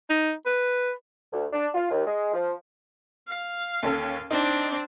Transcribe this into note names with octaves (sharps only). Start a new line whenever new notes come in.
D#4
B4
D2
D4
F4
D#2
G#3
F3
F5
D#2 C#4 A4
C4 D4 D#4